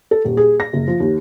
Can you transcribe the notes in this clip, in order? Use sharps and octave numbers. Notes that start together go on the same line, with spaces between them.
A4
D#1
G#4
A#6
F#1
F3
D#2